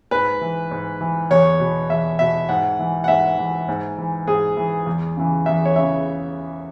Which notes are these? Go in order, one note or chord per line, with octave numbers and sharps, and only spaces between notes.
G#2 B4
E3
G#2
E3
E2 C#5
B2
E2 E5
B2 E5
G#2 F#5
E3
F#5
G#2 E5
E3
G#2
E3
G#2 G#4
E3
E2
C#3 E3
E2 E5
C#5
C#3 E3 E5